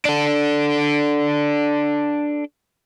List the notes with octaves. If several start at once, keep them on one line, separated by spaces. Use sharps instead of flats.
D4 A4